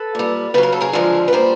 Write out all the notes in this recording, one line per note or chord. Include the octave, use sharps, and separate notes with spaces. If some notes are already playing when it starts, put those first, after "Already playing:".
Already playing: A4 B4
A#2 G3
C#3 F#3 B4
A#4
A4
G#4 A#4
D3 F3 G#3
B4
A#2 G3 A#4 C5